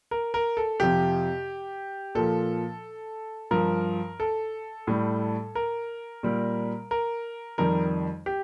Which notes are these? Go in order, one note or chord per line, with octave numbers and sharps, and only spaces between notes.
A#4
A#4
A4
F2 C3 F3 G4
A#2 F3 A4
G2 F3 A#4
A4
A2 G3
A#4
A#2 G3
A#4
F2 D#3 G3 A#4
G4